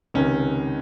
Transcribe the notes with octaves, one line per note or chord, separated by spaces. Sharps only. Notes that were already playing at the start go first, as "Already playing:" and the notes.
C#2 C3 D#3 C#4